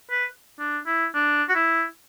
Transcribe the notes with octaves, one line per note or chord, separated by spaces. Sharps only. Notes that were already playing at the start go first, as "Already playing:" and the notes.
B4
D4
E4
D4
F#4
E4